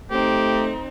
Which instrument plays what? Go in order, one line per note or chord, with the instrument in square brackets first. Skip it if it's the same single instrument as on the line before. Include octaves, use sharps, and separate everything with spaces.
[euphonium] A3 [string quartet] C4 D#4 [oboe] G4